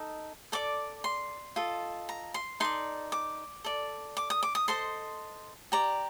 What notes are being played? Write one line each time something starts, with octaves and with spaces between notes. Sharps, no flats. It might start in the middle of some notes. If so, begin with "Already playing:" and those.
Already playing: D#4 A4 D#5
A4 D5 D6
C6
F4 A4 D#5
A#5
C6
D#4 A4 D5 C6
D6
A4 D5
D6
D#6
D6
D#6
A4 C5 D#5 C6
G4 D5 A#5